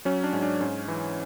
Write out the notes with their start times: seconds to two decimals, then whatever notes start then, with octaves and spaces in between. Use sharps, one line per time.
0.05 F#3 C#4
0.24 D4
0.33 G#2
0.42 D4
0.61 G#2 C#4
0.88 E3